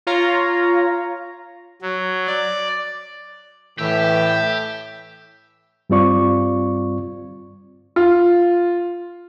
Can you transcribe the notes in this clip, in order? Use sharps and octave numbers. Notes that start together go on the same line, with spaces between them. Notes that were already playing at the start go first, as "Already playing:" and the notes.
F4 C#5 A#5
F#3
D5
A2 E3 G4 E5
G2 G3 C4 F4 D5 C#6
F4